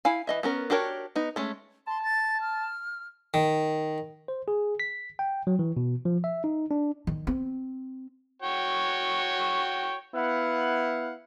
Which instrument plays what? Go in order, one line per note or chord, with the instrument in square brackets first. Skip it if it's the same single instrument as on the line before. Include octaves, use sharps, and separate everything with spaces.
[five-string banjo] E4 F5 G#5
E3 D#5 E5
B3 C#4 A#4
D4 F#4 G4 A#4 C#5
B3 D#4
G#3 A3 C#4
[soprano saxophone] A5 [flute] C6
[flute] A6
F6
[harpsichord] D#3
[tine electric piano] C5
G#4
B6
G5
F#3
E3
B2
F3
E5
D#4
D4
[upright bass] D#3
C4
[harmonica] F#4 C#5 G5
[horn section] B3 E4 F5 F#5